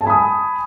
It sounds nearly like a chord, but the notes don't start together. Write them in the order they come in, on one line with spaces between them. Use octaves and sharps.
A5 G#5 B5 D#6